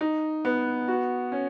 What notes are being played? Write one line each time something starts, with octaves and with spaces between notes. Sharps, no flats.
D#4
B3
F#4
C#4